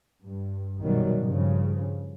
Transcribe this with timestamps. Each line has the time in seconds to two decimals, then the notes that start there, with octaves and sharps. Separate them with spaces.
0.24 G2
0.82 A#1 F#2 B2 D#3 F#3 G3
1.21 G2 C#3 F3